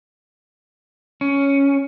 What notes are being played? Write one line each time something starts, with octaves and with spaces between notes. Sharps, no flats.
C#4